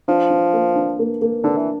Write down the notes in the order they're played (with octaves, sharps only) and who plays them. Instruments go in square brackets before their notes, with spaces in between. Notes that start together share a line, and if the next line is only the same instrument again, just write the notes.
[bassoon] F3 [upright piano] D4
[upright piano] D4
A#3
D4
A#3
A#3
[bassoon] D3 [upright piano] D4
[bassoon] E3